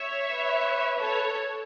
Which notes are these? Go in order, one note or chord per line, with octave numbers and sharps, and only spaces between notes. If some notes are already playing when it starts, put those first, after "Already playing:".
Already playing: C#5 E5
B4
A4 C#5